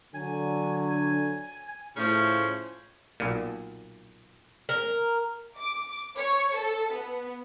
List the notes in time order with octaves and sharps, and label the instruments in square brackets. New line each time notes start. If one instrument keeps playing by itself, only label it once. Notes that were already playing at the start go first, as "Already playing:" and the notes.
[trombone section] D3 [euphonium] F#3 [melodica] G#5
[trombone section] A2 [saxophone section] C#3 F3 C#4 [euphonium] F4
[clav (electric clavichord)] B1 A#2
[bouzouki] A#4
[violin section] D6
C#5
A4
B3